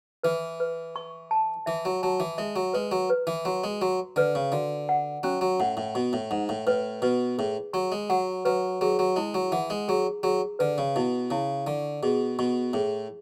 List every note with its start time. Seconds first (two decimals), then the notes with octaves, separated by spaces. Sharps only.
0.23 E3 B4
0.60 B4
0.96 C#6
1.31 A5
1.66 E3 E5
1.85 F#3
2.03 F#3 A5
2.20 E3
2.38 G#3 E5
2.56 F#3
2.73 G#3 B4
2.92 F#3
3.10 B4
3.27 E3
3.45 F#3 F#4
3.64 G#3
3.82 F#3 F#4
4.16 D3 B4
4.35 C#3
4.52 D3 F#4
4.89 F#5
5.23 F#3 C#4
5.41 F#3
5.60 A2 F#5
5.77 A2
5.95 B2 C#6
6.13 A2
6.31 G#2 F#5
6.49 A2
6.67 A2 B4
7.02 B2 B4
7.38 A2 G#4
7.73 F#3 C#6
7.92 G#3
8.10 F#3 F#5
8.45 F#3 B4
8.81 F#3 G#4
8.99 F#3
9.16 G#3 E4
9.34 F#3
9.52 E3 F#5
9.70 G#3
9.88 F#3 G#4
10.23 F#3 G#4
10.59 D3 B4
10.78 C#3
10.96 B2 E4
11.31 C#3 E4
11.67 D3 C#6
12.03 B2 G#4
12.39 B2 C#6
12.73 A2 G#4